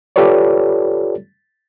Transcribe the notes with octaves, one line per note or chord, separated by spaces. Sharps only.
F4 G4 A4 B4 C#5 D5